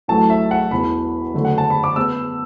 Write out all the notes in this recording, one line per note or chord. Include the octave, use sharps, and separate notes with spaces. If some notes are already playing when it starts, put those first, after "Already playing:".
A1 A2 F#3 A3 A5
E5
F#5
E1 E2 E3 B5
F#1 F#2 D3 A3
F#5
A5
B5
D6
B3 E6